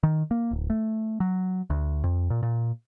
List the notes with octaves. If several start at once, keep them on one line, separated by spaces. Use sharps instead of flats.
D#3
A#3
D1
A3
F#3
D2
F2
A#2
A#2